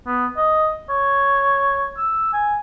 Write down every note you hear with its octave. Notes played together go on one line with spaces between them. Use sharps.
B3
D#5
C#5
E6
G#5